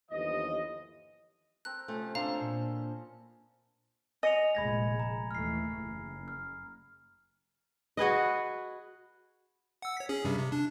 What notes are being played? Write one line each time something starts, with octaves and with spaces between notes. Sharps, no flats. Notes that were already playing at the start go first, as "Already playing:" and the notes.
G1 D#2 E3 F3 D#5
C4 A4 A#4 F#6
C3 F3 A3 C#4
C4 D4 A4 C5 F5 A#5 B5
A#2
D#5 G#5 C#7 F7
F1 A#2 G#3 B5 G#6 A#6
A#5
D#2 E3 A3 F6 C7
F#1
F6
F#4 G#4 B4 D#5
F#5 E6
C#5 B6
C#4 G#4
G2 C3 G3
C3
D4